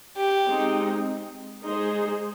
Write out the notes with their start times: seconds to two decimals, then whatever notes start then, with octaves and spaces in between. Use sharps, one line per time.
0.17 G4
0.47 G#3 C4 D#4
1.65 G#3 D#4 G#4 C5